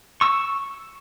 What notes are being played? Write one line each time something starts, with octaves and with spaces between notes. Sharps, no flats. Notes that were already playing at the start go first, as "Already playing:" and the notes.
C#6 E6